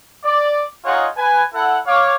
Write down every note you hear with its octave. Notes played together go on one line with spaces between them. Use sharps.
D5
D#4 F4 G#4 C#5 D#5 F#5
B4 G#5
E4 A4 F#5
C#5 F5 D6